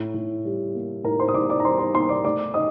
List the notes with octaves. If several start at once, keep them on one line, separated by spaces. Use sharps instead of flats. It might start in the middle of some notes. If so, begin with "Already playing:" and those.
Already playing: A2
A2
G3
A#3
A2 A#4 A#5
C5 C6
D#6
A2 D5 D6
D5 D6
A#5
G3 C5 C6
C5 C6
A#3 C5 C6
D5 D6
A3 D5 D6
D#5 D#6